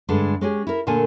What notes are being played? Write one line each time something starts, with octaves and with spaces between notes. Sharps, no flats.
G2 D3 G#3 A3
G#3 C#4 G4 G#4
E4 A#4
A#2 D3 A3 A#3 G#5